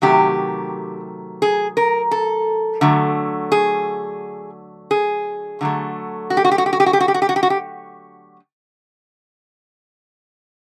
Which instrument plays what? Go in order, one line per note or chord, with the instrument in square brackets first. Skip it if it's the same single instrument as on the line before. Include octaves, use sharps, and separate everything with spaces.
[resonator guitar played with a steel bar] C3 D#3 F#3 A3 G4
G#4
A#4
A4
D3 F#3 A3
G#4
G#4
D3 F#3 A3
F#4
G4
F#4
G4
F#4
G4
F#4
G4
F#4
G4
F#4
G4
F#4
G4
F#4
G4
F#4
G4